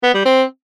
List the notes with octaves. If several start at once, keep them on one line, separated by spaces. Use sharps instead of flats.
B3
G3
C4